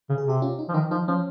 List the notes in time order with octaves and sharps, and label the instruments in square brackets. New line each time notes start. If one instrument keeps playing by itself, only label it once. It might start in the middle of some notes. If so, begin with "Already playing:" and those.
[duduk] C#3
[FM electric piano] G#4
[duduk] C3 [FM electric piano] G4
[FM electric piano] C#4 F4
D#4
[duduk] F3
[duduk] D#3 [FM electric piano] D#4
[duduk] F3 [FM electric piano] D#4
[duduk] F3 [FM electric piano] C#4